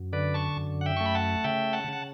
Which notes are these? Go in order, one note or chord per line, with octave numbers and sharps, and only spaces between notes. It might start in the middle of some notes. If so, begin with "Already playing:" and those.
Already playing: F#2
D3 B4 D5
A5 C#6
F#2
F#5
E5 G5
A3 C#6
B5
F#5 A5
C#3 E5 G5
F#5 A5
C#3 F#5